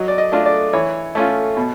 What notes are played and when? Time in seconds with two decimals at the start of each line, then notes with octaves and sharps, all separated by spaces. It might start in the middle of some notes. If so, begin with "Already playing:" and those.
Already playing: F#3 D#5
0.08 D5
0.18 D#5
0.32 A3 D4 F4
0.46 D5
0.73 E3 C#5
1.15 A3 C#4 F4
1.57 B2